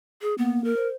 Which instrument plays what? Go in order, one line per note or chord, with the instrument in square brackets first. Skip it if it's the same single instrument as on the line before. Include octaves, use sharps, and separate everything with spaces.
[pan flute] G#4
[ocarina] A#3 [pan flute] B3
[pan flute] A#4
[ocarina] C5